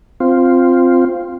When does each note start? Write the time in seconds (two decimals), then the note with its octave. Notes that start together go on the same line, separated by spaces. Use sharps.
0.20 C4 F4